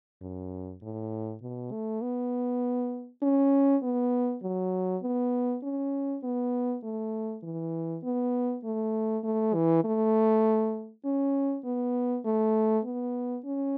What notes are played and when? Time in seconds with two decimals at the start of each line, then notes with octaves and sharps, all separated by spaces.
0.22 F#2
0.82 A2
1.42 B2
1.72 A3
2.02 B3
3.22 C#4
3.83 B3
4.43 F#3
5.03 B3
5.63 C#4
6.23 B3
6.84 A3
7.43 E3
8.03 B3
8.64 A3
9.24 A3
9.54 E3
9.84 A3
11.05 C#4
11.65 B3
12.25 A3
12.85 B3
13.45 C#4